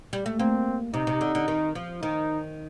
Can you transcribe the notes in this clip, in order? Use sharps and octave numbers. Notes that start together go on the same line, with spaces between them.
G3
A3
A#3 C4
C3 D#4
C3
D3
D3
D#3
F3
D#3 D#4